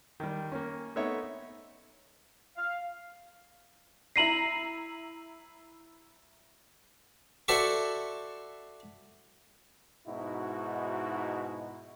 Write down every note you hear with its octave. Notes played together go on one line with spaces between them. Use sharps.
D#3 G3
A#3 C#4
A3 B3 C4 D#4 C#5 E5
F5
E4 A#5 A#6 C7 D#7 F#7
F#4 A4 C5 D5 E5 C#6
G#2 B2 D#4 E4 F#4